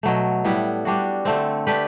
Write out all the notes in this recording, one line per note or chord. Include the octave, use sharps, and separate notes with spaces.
B2 F#3 A3
A2 G3 B3 E4
G3 D4 F#4
D3 A3 C4
A3 D4 G4 B4